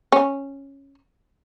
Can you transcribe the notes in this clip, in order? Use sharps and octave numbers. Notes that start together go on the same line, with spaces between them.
C#4